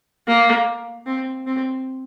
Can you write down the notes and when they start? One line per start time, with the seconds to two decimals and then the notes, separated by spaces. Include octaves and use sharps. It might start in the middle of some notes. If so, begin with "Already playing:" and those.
0.27 A#3
1.06 C4
1.47 C4